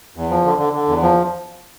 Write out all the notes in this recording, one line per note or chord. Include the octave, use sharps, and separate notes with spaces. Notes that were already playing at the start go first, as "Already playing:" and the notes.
E2
F3
D3
D3
D3
E2
F3